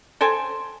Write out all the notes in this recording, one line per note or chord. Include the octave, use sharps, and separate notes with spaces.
A4 C5 G5 G#5